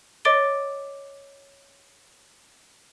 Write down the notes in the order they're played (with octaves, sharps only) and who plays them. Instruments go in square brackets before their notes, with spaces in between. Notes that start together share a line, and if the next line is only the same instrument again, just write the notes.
[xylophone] C#5 D#5 D6 A6 D7 G7